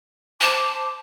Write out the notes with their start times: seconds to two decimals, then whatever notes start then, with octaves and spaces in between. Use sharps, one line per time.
0.41 C5 A5 D6